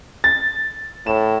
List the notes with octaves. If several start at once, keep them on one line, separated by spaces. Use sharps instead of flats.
A6
A2 E7